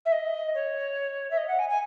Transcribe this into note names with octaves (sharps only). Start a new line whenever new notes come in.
E5
D#5
C#5
E5
D#5
F#5
G#5
G#5